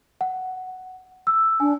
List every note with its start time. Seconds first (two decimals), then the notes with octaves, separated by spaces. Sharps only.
0.21 F#5
1.27 E6
1.60 D4 G#5